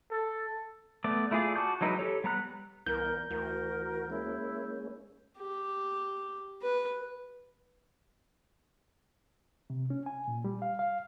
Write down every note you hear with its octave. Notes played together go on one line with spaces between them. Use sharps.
A4
A3 B3 D5
A3 E4 F4 G#4 D5
F#4 A5 D6 G6
F#3 G#3 D#4 E4 B4
G4 A4 C#5
G3 B3 A#5 F#6
C2 E3 B3 A#4 G6
D2 E3 F#4 A#4
G#3 A#3 C#4 E4
G4
B4
C3
C#4
G#5
A#2
G3
F5
F5